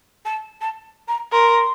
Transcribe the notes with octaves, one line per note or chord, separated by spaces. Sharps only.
A5
A5
A#5
A#4 C6